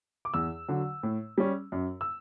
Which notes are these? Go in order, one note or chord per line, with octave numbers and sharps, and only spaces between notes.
D6
E2 E6
D3 F#3
A2
G3 C#4
F#2
E6